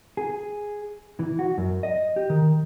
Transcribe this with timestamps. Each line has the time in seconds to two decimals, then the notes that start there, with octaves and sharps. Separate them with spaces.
0.17 G#4
1.19 E3
1.39 F#4
1.58 F#2
1.83 D#5
2.16 G4
2.30 D#3